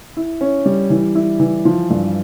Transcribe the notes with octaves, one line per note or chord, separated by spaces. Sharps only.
E4
C#4
G3
E3
E4
E3
F3
G2